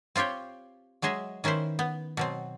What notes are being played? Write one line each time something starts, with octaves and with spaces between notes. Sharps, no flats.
C4 F4 G4 C#5 G5
F#3 G#3 G#4 D#5 E5
D#3 C#4 E4 B4 C5
B3
B2 F#3 C4